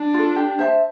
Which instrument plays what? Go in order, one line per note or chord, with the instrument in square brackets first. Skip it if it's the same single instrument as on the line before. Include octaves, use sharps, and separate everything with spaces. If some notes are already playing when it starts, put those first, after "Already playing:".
Already playing: [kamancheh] D4
[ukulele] F4 A4
G4
C5 E5 A5